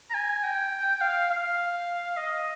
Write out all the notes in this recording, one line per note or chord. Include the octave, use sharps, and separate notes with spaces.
A#5
G#5
G5
F5
F5
D#5